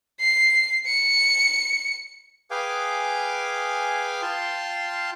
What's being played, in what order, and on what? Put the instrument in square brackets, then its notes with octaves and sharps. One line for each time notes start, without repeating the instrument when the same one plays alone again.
[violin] C7
C#7
[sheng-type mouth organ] G#4 B4 F5 G5 G#5 D6
F4 F5 G5 A5 C6